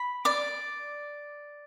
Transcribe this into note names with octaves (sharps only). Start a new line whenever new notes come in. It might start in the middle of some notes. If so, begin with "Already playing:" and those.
Already playing: B5
D5 D6